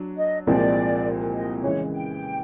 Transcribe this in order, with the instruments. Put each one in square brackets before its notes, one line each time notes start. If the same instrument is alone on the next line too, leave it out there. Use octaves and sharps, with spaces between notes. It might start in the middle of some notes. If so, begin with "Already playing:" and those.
Already playing: [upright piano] F#3 D4
[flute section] D#5
[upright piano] C2 A#2 F3 G#3 C4 [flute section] D5
[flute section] D#5
[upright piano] C#3 E3 G#3 [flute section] C#5
[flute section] G5